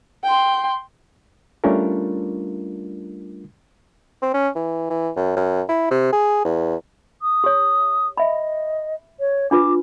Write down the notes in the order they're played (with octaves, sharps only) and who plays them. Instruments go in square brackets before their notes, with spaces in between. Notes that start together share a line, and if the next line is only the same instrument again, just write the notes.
[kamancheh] G5 C6
[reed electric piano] G3 A3 C#4 D4 F4 A#4
[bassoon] C4
C#4
E3
E3
F#2
F#2
E4
C3
G#4
E2
[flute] D#6
[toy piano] G4 C#5
[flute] D#5 [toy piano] E5 B5
[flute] C#5
[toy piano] D4 F4 B4 [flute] D6